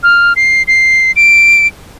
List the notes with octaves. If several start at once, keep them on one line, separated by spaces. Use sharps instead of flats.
F6
C7
C7
D7